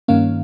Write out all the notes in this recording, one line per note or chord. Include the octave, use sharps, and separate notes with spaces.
G2 D#3 A#3 C#4 F5